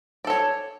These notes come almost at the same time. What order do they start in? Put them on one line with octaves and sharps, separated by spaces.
D5 A4 C#5